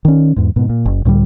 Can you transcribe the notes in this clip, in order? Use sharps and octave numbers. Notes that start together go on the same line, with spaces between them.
D#3 C#4
E2 G#2
G#2 B2
A#2
F#1
C#2 A2 D3 G3